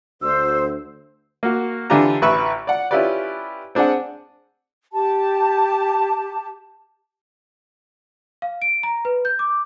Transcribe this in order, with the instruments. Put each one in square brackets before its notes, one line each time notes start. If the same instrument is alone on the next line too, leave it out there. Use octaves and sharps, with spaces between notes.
[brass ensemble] D2 [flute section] C5 [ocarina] E6
[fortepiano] A#3 F#4
D3 E3 D4 F4 G4 A#5
A1 B4 E5 B5 C#6 E6
D5 F#5
C#4 E4 F4 G4 B4 D5
C4 D4 G#4 D5 F#5
[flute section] G4 A5
[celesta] F5
D7
A#5
B4
G6
D6